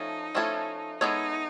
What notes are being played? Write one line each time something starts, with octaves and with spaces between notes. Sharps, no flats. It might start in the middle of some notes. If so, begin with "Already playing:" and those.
Already playing: F3 A3 C#4 D#4 E4 A4
F3 A3 C#4 E4 A4
G#3 B3 D#4 E4 A4 C#5